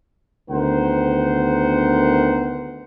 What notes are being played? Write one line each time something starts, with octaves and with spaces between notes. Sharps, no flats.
D2 D#3 B3 A#4 C5 F#5